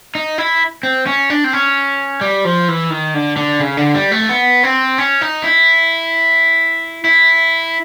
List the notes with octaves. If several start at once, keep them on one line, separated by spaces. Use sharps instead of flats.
D#4
E4
C4
C#4
D4
C4
C#4
G3
F3
E3
D#3
D3
D3
C#3
D3
G3
A3
B3
C4
C#4
D#4
E4
E4